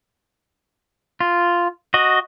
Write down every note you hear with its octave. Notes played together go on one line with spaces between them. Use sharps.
F4
F#4 D#5